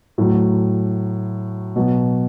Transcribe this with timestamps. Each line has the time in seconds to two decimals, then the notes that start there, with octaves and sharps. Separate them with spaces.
0.18 A2 F#3
1.76 B2 F#3